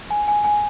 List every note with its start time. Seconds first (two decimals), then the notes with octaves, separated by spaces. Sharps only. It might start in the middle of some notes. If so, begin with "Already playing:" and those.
0.10 G#5
0.28 G#5
0.44 G#5